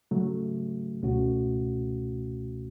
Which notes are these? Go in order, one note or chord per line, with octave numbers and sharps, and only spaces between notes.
C#3 F#3 A3
C#2 B2 A3 C#4 F#4